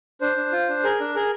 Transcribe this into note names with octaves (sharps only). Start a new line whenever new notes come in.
D4 C5
D4
F4
D4
G#4 A#4
D4
G#4 A#4